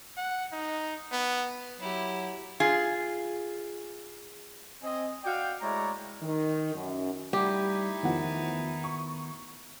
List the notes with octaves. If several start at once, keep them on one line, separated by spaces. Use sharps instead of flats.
F#5
D#4
B3
F#3 E4 G4
F4 G#4
C4 D#5 G#5
F#4 D5 F5 G5
G#3 A3 E4 C#5 D5 A#5
D#3
F#2
G3 A3 D#4 E4 G4
E2 D#3 F3 B3 F#5
C#6